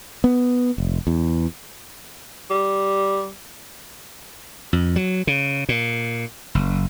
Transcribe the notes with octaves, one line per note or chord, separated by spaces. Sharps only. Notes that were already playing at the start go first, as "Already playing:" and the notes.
B3
F1
E2
G3
F2
F#3
C#3
A#2
F#1